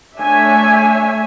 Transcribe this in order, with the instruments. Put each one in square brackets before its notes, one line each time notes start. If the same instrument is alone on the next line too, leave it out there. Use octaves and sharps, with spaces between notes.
[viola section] A3 D4 C#5 E5 G#5